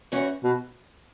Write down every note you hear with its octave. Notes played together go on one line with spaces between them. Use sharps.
E2 E3 C#4 F#4
B2